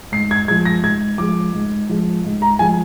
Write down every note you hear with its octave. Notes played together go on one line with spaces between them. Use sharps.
G#2 C7
G#6
F3 G#3 G#6
A#6
G#2 G#6
F3 G#3 D6
G#2
F3 G#3
G#2
A#5
F3 G#3 G#5